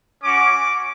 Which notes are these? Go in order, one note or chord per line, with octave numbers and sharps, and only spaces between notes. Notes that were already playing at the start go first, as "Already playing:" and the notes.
C#4 F#4 D6